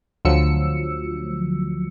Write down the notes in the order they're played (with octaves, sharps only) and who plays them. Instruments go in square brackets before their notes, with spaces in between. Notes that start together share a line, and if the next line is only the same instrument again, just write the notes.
[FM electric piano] D2 F3 F#3 E6 C#7